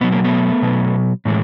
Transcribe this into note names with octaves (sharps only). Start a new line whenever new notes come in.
B2 F#3 B3
A#3
A3 B3
B2 F#3
A2 E3 G#3